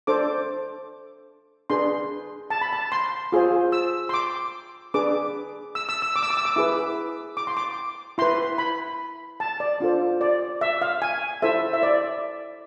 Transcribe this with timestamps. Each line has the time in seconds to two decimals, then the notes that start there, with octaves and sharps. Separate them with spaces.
0.07 D4 A4 C5 D6
1.70 D4 G#4 B4 C6
2.50 A5
2.61 B5
2.73 A5
2.92 C6
3.32 F4 G#4 C5
3.72 E6
4.09 C6
4.14 D6
4.94 D4 G#4 B4 D6
5.75 E6
5.89 E6
6.02 E6
6.16 D6
6.23 E6
6.30 D6
6.37 E6
6.45 D6
6.56 E4 G#4 B4 D6
7.37 D6
7.47 C6
7.57 D6
8.18 E4 B4 C6
8.58 B5
9.40 A5
9.60 D5
9.80 D4 F4 A4 C5
10.21 D5
10.61 E5
10.82 F5
11.02 G#5
11.42 E4 A4 C5 E5
11.73 E5
11.83 D5